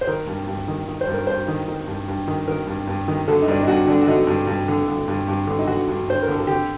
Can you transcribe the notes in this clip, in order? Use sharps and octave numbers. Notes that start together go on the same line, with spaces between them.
C5
D#3 A#4
G2
G2
D#3
D#3
C5
G2
A#4
G2 C5
D#3
D#3
G2
G2
D#3
D#3 A#4
G2
G2
D#3
D3 A4
D#4
G2 D4
D#4
G2 F#4
D3 D4
F#4
D3 D#4
G2
G2
D3
D3
G2
G2
D3
D#4
D3 F#4
G2
G2 C5
A#4
D3
A4
D3 G4